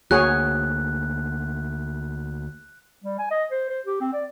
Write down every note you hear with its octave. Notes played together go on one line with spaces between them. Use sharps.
D2 A#3 F#4 G#4 C#5 F#6
G3
G#5
D#5
C5
C5
G4
C4
D5